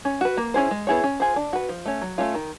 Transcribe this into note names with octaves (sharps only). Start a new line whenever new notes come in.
C#4
F#4 B4
A#3
C#4 E4 G#4 C5
G#3
B3 E4 G#4 C#5
C#4
F4 G#4 C5
D4
F#4 B4
F3
A3 C#4
F#3
A3 C#4 F4
D#3